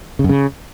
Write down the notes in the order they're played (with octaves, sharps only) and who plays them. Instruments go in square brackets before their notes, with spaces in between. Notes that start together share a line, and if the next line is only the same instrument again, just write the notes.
[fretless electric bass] C#3
F#2
C#3